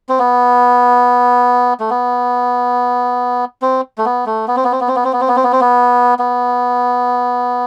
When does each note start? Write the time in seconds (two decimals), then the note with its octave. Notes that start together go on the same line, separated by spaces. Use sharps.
0.09 C4
0.19 B3
1.80 A3
1.90 B3
3.62 C4
3.98 A3
4.05 B3
4.26 A3
4.48 B3
4.56 C4
4.64 B3
4.72 C4
4.80 B3
4.88 C4
4.96 B3
5.04 C4
5.13 B3
5.21 C4
5.28 B3
5.36 C4
5.44 B3
5.52 C4
5.61 B3
6.19 B3